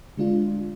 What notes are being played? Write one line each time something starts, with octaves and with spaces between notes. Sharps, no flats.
D3 G#3 D4 F4